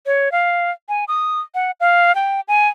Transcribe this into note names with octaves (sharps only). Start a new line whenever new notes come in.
C#5
F5
G#5
D#6
F#5
F5
G5
G#5